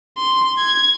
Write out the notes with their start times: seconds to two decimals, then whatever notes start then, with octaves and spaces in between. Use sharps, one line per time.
0.18 C6
0.58 G#6